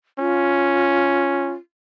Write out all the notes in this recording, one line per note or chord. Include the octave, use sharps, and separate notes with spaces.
C#4 F4